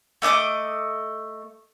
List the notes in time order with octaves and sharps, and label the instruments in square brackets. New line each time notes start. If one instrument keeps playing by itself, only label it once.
[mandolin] A3 D#5 D6 D#6